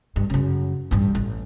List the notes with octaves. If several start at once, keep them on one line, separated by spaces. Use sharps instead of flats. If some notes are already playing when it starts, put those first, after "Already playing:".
G2
F#2 C#3
A1 G2
A1